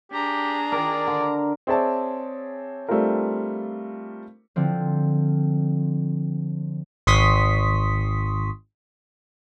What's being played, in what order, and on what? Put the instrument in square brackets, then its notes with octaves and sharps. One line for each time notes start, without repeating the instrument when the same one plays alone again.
[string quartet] D4 G#4 A#5 [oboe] G4
[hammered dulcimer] D#3 A#4 [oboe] D5
[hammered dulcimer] D3
[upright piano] C4 G#4 C#5 D5 E5 A5
G3 A3 C4 D4 F4 A#4
[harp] D3 F3 C4
[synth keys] G#1 C6 C#6 D#6 B6